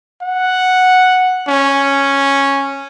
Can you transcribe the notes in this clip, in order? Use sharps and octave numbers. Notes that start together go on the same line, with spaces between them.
F#5
C#4